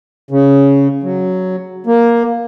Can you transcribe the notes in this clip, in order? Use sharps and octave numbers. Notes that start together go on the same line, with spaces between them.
C#3
F#3
A#3